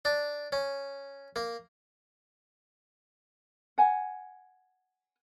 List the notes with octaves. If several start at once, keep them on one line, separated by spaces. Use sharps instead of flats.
D4
C#4
A#3
F#5 G#5